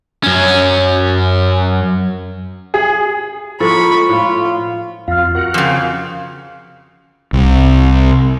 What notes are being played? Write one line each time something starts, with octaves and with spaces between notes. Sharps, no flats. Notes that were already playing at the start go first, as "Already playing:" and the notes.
F#2 C#4
G#4
F3 G#3 A#3 E4 A4 B5 C#6
A2 F4
F2 F4 F5 F6
F#4 A#4 F#5
F2 C#3
C2